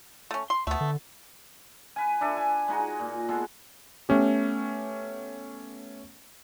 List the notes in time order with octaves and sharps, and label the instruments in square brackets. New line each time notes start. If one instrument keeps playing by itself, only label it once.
[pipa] A3 C#4
C6
[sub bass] D2 [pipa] A3 B3
[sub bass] D3
[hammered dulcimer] B4 G#5
D4 E4 A4
G#5
G#3 D#4 F#4
A#2
G#3 B3 A4
[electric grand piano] A3 B3 C#4 G4